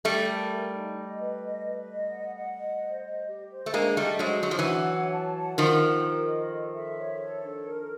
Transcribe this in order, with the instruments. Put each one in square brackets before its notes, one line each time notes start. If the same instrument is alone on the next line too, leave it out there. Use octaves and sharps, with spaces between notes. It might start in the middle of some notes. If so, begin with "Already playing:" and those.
[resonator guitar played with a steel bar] G3 A3 [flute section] G4
[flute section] A#4
A#4
D#4
D#5
B4
D#5
B4
D#5
F#5
F#5
D#5
C5
D#5
G4
C5
[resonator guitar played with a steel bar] A3
[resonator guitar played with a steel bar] G#3 A#3 [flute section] D4
[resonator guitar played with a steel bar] G3 A3 [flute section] D#5
[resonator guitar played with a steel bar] F#3 G#3 [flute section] C5
[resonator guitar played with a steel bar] F#3 [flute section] D4
[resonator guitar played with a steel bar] F3
E3 F#3
[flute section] F#5
C#5
A5
F#5
[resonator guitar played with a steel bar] D#3 F3 [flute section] A#4
[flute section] G4
A#4
D#5
A4
E5
C#5
A4
D4
A#4